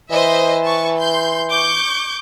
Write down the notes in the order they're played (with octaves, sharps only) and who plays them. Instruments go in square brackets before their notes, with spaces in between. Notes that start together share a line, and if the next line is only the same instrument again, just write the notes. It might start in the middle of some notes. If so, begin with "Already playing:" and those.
[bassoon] E3 [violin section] C5 D#5 E5
[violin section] B4 A5 C#6
C6 G6
C#6 D6 G6